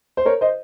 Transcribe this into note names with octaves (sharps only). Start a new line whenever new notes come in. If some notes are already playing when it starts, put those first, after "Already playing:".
C5
A#4 C#5
C5 D#5